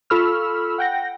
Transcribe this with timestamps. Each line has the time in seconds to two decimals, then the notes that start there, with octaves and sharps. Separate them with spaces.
0.10 F4 A4 B5 C#6 E6 F6
0.78 F#5 G5 A#6